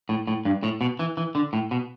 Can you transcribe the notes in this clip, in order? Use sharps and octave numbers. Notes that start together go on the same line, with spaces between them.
A2
A2
G2
A2
B2
E3
E3
D3
A2
B2